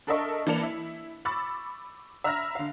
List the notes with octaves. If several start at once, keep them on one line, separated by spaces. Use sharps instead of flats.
D4 A4 A#4 D#5 E5 C#6
E3 A#3 D5 A5 C#7 F7
E4
B5 C#6 D6 E6 A6
E5 A#5 B5 E6 F6 A#6
D3 F5